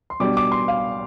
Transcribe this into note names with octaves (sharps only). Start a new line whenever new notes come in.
C6
B2 G3 D4 D6
D6
C6
F5